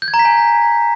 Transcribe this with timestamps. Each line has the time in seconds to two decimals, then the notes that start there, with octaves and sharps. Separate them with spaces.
0.02 G6
0.08 G#6
0.14 A#5
0.19 B6
0.25 G#5